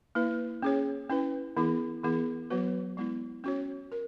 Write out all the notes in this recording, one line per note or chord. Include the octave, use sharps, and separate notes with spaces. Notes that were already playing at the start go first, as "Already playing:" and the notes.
A#3 E4 B4
C#4 G#4 C#5
C#4 E4 B4
E3 B3 E4 G#4
E3 B3 E4 G#4
F#3 B3 F#4 B4
G#3 B3 E4
C#4 F#4 C#5
A#4